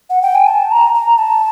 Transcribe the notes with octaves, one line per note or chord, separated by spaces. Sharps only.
F#5
G5
G#5
A5
A#5
A#5
A5